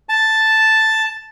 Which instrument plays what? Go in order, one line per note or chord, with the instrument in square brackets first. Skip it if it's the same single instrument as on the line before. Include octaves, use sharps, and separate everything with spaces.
[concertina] A5